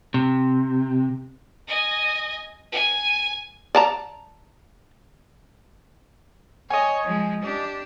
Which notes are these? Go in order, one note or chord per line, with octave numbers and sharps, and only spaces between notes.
C3
D#5 G#5
G#5
D5 A5 A#5
C#5 D#5 G#5
F3 G#3
D4 G4